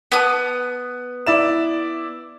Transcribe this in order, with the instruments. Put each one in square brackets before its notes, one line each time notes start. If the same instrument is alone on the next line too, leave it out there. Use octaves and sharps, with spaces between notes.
[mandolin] B3 D#6
[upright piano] E4 D5 E7